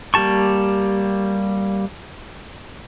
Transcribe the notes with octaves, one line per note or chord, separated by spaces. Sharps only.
G3 A#3 G4 A5 C#6